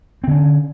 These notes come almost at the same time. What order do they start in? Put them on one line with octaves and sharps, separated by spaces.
C4 D3 C#4